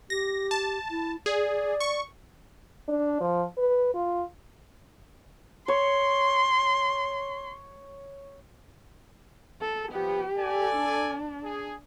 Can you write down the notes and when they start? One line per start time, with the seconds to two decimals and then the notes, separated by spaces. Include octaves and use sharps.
0.10 G4 A#6
0.51 A5
0.91 E4
1.26 G#4 D5
1.80 C#6
2.88 D4
3.21 F3
3.58 B4
3.95 F4
5.68 C#5 C6
9.61 A4
9.92 F3 G3 B3 G4
10.38 A4 D5 G#5
10.76 D4
11.44 G#4